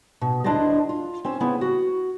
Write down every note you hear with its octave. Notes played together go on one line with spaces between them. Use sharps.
B2
D2 D4 E4 C5 D5 D#5
F4
C4 C#4 C5
C#3 B3 E4
F#4